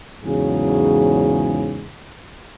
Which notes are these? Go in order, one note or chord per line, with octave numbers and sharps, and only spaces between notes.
E2 G#2 C#3 F#3 G#4